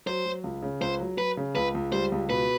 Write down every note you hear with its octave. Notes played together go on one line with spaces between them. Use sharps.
F#3 C5
F#3
C#2
C#3
C#2 C5
F#3
F#3 B4
C#3
C#2 B4
C#2
G3 C5
C#2
B2 B4